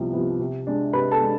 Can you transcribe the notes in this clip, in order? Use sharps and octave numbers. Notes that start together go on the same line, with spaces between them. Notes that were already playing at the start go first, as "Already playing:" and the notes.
Already playing: C2 C3 F3 B3
C3 F3 B3
C3
G#3 D4
C3 B4 B5
A4 A5
G#3 D4